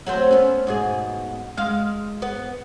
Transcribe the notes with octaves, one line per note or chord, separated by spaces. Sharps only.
F#3 A3 C4
B3 C#4
G#2 B2 G#4
G#3 F5
B3